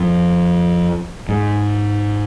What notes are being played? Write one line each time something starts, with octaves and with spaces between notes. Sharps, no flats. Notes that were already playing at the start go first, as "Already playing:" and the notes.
Already playing: F2
G#2